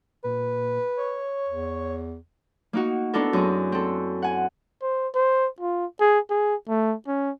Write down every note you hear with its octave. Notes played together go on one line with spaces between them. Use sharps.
A#2 B4
C#5
E2
A#3 D#4 F#4
B3 D4 E4 A4 A#4
F#2 C4 G#4
C4 A4
F#5 G#5
C5
C5
F4
G#4
G#4
A3
C#4